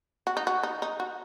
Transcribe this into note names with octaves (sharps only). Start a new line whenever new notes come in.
F#4
D#4
F#4
D#4
D#4
F#4